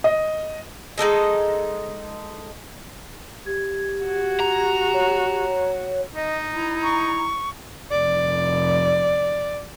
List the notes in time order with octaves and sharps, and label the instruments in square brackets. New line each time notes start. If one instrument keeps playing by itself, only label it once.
[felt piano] D#5
[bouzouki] G#3 D#4 A4 D#5
[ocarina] G4 [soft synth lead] G#6
[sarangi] F#4
[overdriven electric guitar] A#5
[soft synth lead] C#5
[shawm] D#4 [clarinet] D#5
[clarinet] E4 [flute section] A#5
[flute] C#6
[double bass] F1 [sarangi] D5